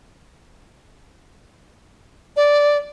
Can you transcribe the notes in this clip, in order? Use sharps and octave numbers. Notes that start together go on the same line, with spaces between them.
D5